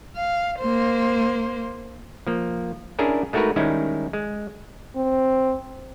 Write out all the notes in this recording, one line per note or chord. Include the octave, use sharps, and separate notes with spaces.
F5
A#3 C5
F3 A#3
C#4 D4 E4 G#4 A#4 E5
G#3 A3 D#4 F#4 A#4 B4
D#3 G3 G#3 C#4 D#4 E4
G#3
C4